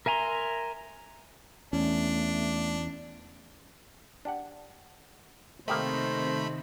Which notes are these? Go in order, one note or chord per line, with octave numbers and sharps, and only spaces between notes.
A#4 E5 G#5 A#5 C6
E2 A3 C#4 D4
D4 G4 F#5
C3 D#3 A3 A#3 G4 C5 D#5 B5